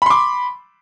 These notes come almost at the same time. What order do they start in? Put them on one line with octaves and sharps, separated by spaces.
B5 C6 D6